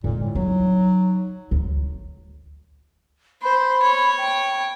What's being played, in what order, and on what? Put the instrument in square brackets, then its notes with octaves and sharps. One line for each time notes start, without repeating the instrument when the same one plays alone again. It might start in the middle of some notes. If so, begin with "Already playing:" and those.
[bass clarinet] A#2 [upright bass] D3 G#3
[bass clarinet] A2
[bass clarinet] F#3 [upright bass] D#4
[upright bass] D2
[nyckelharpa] C5 [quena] B5
[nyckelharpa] C#5
[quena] G5